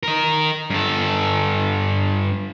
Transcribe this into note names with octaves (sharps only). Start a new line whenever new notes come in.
A#4 D#5
G2 A4